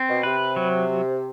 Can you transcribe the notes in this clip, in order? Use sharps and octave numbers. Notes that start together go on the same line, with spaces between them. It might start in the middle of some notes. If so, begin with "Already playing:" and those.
Already playing: C4
B2
C3 B4
F#3